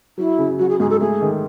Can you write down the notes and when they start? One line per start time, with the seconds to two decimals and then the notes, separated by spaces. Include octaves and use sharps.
0.18 F#3 E4
0.38 C#3
0.59 F#3 F#4
0.70 G#4
0.80 G#2 G#4
0.90 A4
1.00 A3 G#4
1.21 D#3